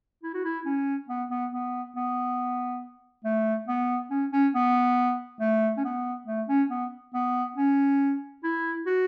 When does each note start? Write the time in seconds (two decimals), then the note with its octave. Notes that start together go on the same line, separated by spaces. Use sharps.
0.23 E4
0.34 F#4
0.45 E4
0.65 C#4
1.09 B3
1.31 B3
1.52 B3
1.96 B3
3.25 A3
3.68 B3
4.11 C#4
4.33 C#4
4.55 B3
5.41 A3
5.77 C#4
5.85 B3
6.27 A3
6.48 C#4
6.70 B3
7.14 B3
7.56 C#4
8.44 E4
8.87 F#4